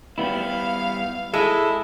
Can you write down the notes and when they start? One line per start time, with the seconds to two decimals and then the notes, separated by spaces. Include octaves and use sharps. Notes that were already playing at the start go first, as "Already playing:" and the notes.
0.18 G3 B3 E4 F5
1.34 G#3 E4 A4